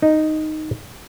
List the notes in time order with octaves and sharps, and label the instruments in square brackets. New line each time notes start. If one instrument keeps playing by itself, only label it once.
[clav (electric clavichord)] D#4